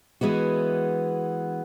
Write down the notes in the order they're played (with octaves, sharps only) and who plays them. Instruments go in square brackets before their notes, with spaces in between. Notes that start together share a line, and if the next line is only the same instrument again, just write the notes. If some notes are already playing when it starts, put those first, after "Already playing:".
[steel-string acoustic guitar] E3 G#3 B3 F#4